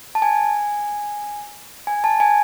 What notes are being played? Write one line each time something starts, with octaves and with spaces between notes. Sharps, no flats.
A5
G#5
G#5
A5
G#5